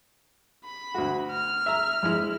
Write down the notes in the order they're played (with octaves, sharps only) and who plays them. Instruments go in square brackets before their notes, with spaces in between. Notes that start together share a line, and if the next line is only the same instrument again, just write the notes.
[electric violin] B5
[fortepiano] D2 F#4
[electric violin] F6
[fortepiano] E5 A#5
F2 G#3 E4